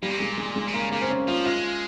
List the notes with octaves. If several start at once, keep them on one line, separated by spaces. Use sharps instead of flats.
A#2 G3
C3
A#2 G#3
G#3
G#3
C3
C#3 A#3
C#3 A#3
C4
C#4
F3 F4
G#3 F4